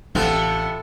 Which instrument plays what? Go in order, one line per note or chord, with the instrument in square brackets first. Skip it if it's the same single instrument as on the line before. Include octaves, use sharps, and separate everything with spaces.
[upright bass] A1 [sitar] C3 B3 F4 [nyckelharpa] A4